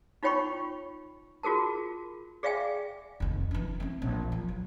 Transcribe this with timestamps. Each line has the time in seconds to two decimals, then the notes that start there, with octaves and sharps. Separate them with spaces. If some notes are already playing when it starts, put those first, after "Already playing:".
0.23 D#4 F4 C#5 G5 B5 C#6
1.43 F4 F#4 G#4 A#4 A5
2.43 G#4 D5 E5 F5 G5 G#5
3.20 F1 D#2
3.51 E3 D4
3.80 A3 C4
4.02 A#1
4.32 F3
4.49 F#3